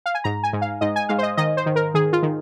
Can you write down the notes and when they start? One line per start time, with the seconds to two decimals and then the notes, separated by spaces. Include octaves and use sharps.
0.06 F5
0.15 G#5
0.24 G#2 A#5
0.43 G#5
0.53 G#2
0.62 F5
0.81 G#2 D#5
0.96 G#5
1.09 G#2 F5
1.18 C5
1.23 D#5
1.37 D#3 D#5
1.57 C5
1.66 D#3
1.76 A#4
1.94 D#3 G#4
2.13 F4
2.23 D#3